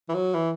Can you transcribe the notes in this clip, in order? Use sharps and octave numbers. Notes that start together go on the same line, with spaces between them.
E3
F#3
E3